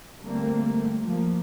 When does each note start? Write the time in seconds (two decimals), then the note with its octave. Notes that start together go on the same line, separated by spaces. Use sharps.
0.22 D3 G3 A3 A#3 C4
1.05 F3 A#3